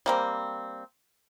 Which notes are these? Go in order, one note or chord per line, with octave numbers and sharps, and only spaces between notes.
G3 A#3 C4